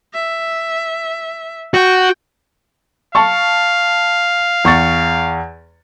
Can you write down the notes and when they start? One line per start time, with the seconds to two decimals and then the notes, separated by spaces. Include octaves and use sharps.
0.14 E5
1.74 F#4 G5
3.15 F5 A5 C#6
4.65 E2 C#6 A6